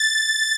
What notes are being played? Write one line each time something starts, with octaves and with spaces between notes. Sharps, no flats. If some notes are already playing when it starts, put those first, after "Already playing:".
Already playing: A6